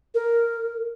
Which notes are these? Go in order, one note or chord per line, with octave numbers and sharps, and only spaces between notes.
A#4